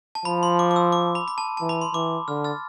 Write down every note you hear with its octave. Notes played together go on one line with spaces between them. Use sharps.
A5
F3 B5
C6
D6
D6
E6
D6
B5
B5
A5
E3 A5
B5
C6
E3 D6
D3 F6
F6 A6